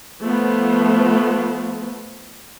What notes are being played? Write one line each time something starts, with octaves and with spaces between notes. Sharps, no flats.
F3 A3 B3